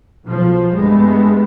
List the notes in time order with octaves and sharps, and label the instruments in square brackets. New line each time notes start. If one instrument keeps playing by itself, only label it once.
[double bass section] B1 F3
G2 G#3 A3 B3